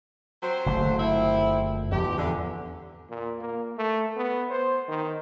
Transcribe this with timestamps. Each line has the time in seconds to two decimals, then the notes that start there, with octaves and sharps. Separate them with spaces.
0.43 F#3 C4 C5
0.66 F#1 D3 A3
0.99 F3 C4 E4
1.91 E2 G#2 F3 G4
2.18 E2 D3
3.10 A#2
3.40 A#3
3.78 A3
4.16 B3
4.50 C5
4.88 D#3